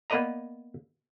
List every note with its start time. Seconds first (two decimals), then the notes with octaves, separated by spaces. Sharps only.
0.10 A#3 B3 B4 D5 D#5 A#5